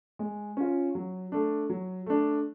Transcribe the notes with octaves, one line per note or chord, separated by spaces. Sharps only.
G#3
C#4 F4
F#3
A3 D4
F#3
A3 D4